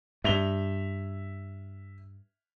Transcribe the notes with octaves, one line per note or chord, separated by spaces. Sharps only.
G2 E5 F7 G7